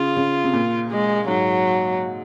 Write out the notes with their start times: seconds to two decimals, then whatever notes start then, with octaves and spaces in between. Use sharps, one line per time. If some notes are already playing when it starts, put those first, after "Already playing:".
Already playing: C#3 F4
0.16 C#3
0.44 C3
0.53 A#2
0.90 G#3
1.28 G#2 F#3